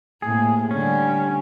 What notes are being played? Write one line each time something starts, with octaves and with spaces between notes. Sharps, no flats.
A2 C3 A#3 G#4
D3 G3 C#4